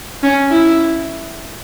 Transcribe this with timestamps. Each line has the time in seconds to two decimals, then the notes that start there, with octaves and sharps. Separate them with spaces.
0.23 C#4
0.52 E4